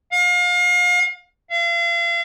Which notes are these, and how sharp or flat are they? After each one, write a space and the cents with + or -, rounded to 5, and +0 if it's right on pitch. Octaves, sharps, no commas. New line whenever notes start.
F5 +35
F5 -40